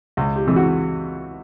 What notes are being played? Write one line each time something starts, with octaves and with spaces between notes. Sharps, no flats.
C#2
G4
C3 E3 G#3
F#4